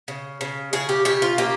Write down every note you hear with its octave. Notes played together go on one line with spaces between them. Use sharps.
C#3
C#3
C#3 G#4
G4
C#3 G4
F4
A#3 G4